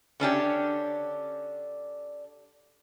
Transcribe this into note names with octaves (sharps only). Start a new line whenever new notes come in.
D3 C#4 D4 G4